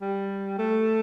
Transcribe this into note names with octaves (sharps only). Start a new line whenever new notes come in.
G3
A3